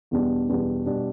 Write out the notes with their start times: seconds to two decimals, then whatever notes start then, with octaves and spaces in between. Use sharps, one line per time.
0.11 E2 B2 G3 B3 D4
0.49 E2 B2 G3 B3 D4
0.86 B2 G3 B3 D4